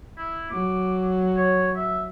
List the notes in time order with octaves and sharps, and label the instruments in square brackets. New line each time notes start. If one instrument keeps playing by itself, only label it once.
[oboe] E4
[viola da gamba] F#3 [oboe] D6
[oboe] C#5
E5